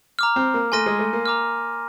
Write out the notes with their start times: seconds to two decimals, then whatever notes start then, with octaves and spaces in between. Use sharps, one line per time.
0.19 A#5 D6 F6
0.36 C4
0.54 A#3
0.72 A3 G#5 C6 F6 A#6 D#7
0.86 G#3
0.99 A3
1.13 A#3
1.26 A#5 D6 F6